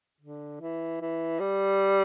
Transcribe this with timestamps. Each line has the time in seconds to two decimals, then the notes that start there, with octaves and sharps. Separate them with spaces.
0.21 D3
0.61 E3
1.01 E3
1.40 G3